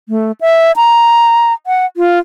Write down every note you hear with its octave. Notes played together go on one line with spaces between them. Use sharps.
A3
E5
A#5
F#5
F4